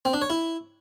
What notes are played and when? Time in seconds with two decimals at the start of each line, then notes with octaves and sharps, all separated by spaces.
0.05 C4
0.13 D4
0.22 C#5
0.30 E4